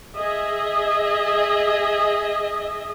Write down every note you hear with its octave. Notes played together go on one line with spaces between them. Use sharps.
G#4 D#5 E5